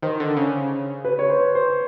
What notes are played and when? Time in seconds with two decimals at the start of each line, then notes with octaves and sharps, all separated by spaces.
0.02 D#3 C5
0.20 D3
0.37 C#3
1.05 B4
1.19 C#5
1.29 C5
1.55 C5